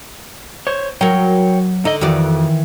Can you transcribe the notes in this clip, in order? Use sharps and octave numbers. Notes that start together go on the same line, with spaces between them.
C5 C#5
F#3 A#4 C#5 G5
D3 D#4 D#5
F2 D#3 E3 F#4 D5